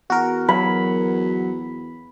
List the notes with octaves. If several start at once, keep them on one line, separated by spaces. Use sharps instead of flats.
E2 F#4 A#4
F#3 B5